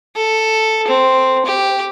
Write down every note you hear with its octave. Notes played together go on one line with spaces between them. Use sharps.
A4
C4
G4